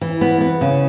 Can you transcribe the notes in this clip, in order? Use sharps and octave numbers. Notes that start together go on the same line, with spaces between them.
E3
B3
B3
C#3